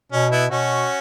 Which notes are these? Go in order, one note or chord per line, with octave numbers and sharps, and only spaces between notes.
B2 C#4
B3 E4
B2 C#4 F#4